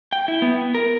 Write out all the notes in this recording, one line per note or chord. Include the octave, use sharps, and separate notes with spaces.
G5
E4
B3
A#4